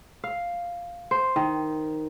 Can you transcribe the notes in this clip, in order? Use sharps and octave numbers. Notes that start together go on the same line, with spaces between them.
F5
C5
D#3